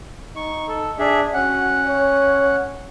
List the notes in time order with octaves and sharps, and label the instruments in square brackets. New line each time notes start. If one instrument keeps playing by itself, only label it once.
[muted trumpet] D#4 [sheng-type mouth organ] C#6
[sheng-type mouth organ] A4
[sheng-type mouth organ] D4 G#4 E5 [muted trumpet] D5
[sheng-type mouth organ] C#4 F#5 [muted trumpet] F#4
[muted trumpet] C#5